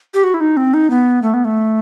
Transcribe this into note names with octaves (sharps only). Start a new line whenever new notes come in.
G4
F#4
E4
D#4
C4
D#4
B3
A3
B3
A3